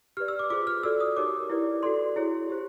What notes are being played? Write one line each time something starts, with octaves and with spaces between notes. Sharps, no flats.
G4 B4 D5 F6
E6
D6
F4 G#4 C5 D6
F6
F#4 A4 D5 E6
D#6
D#4 G4 A#4 C#5 D6
E4 G4 B4 D5
F#4 A4 D5 C6
E4 G#4 C#5
G4 C5